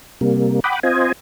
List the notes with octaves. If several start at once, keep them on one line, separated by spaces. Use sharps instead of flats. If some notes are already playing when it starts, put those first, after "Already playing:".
C3 G3 A#3
F#5 G5 B5 D6 D#6
C4 F4 C5 D#5 G#5